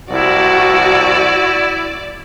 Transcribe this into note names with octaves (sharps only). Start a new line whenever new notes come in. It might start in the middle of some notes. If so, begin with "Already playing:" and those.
C2 E4 F#4 D5